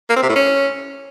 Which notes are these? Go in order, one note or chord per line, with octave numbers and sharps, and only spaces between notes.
A#3
C4
C3
A2
C#4